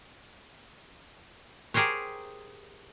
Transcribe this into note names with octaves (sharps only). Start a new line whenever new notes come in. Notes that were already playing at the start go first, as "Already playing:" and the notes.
G4 G#4 A#4 C5 C#5